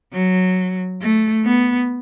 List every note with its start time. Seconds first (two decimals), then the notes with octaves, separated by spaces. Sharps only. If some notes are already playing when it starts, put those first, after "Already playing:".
0.13 F#3
1.01 A3
1.45 B3